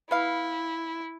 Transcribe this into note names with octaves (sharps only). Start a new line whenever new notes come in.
B3 E4 F5